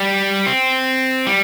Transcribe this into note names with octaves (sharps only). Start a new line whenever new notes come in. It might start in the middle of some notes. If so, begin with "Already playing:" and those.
Already playing: G3
C4
G3